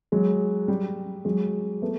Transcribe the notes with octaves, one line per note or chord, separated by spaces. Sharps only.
F#3 G#3
G3
F#3 G#3
A3 B3